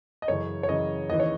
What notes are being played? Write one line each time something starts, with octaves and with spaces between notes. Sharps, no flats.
D#5
F#2 C#3 E3 C#5
C#5
F#2 C#3 E3 D#5
D#2 C#3 E3 D#5
C#5